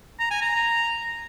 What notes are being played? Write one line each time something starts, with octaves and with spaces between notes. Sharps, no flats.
A#5
G#5
A#5